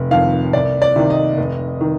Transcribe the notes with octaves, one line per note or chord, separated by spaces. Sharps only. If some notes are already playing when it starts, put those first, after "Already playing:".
Already playing: F1
F2 D#3 F5
C2 D5
D5
C3 D#3
D#5
F1
D#3